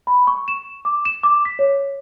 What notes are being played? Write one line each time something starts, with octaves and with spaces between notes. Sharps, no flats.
B5
C#6
E7
D6
E7
D6
B6
C#5